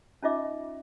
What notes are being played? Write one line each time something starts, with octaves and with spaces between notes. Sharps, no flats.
C#4 D#4 F4 D#5 E5 D6